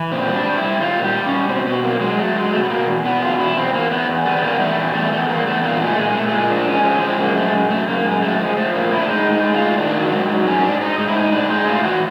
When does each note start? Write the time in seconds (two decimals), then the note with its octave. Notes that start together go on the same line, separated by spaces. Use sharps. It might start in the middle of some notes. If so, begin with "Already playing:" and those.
Already playing: E3
0.12 A#2 C4
0.29 G3
0.34 D4
0.46 G3
0.57 E4
0.63 G3
0.80 G3 F4
0.98 A#2
1.04 G4
1.15 G3
1.26 C#4
1.32 G3
1.49 B2 C4
1.66 B2 B3
1.84 F#3 A#3
2.01 F#3 G#3
2.18 F#3 A3
2.36 F#3 G#3
2.52 B2 A3
2.63 B3
2.70 B2 A#3
2.87 E2
3.05 E2 B3
3.22 B2 F4
3.39 E2 E4
3.56 E2 C4
3.73 E2 A#3
3.91 E2 B3
4.08 E2
4.25 G3 B3
4.36 B3
4.42 E2 A#3
4.60 G3 A3
4.77 E2
4.94 E2 A3
5.12 E2 A3
5.24 B3
5.29 E2 A#3
5.46 E2 A3
5.63 A#2 A#3
5.81 G#3 A3
5.98 A#2 G#3
6.09 G#3
6.15 A#2 A3
6.27 A3
6.32 A#2 G#3
6.50 F3 D4
6.67 G#3 C#4
6.84 F3 C#4
7.01 G#3 C4
7.19 F#2 A#3
7.36 G#3 A3
7.53 F#2
7.70 F#2 A3
7.88 F#2 A#3
8.05 F#2 G#3
8.22 G#3 A3
8.39 F3 G#3
8.57 F3 A3
8.74 A2 A#3
8.91 A2 E4
9.01 D4
9.08 G#3 D#4
9.26 A2
9.31 D#4
9.43 G#3
9.54 F4
9.61 A2
9.78 D#3 D4
9.95 F#3
10.12 G#2
10.29 F#3
10.47 G#2 C#4
10.64 G#2 D4
10.81 G#2 D#4
10.98 G#2 D#4
11.08 E4
11.15 A2 D#4
11.32 A2 D4
11.50 G#3 D#4
11.67 A2 F4
11.84 E3 F#4